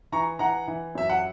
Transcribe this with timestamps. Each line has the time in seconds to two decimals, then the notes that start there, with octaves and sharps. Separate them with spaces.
0.12 E3 A#5 C#6
0.39 E3 F#5 A#5
0.68 E3
0.95 F#2 E5
1.10 F#5